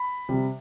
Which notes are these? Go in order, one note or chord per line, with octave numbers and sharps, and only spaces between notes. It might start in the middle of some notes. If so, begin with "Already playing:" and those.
Already playing: B5
C3 G3